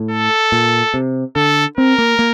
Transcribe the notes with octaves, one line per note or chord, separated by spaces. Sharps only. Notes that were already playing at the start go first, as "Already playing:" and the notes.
Already playing: A2
A4
A#2
C3
D3 A4
C4 A#4
A#3
A#3